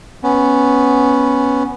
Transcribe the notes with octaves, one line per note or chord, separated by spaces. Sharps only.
B3 C#4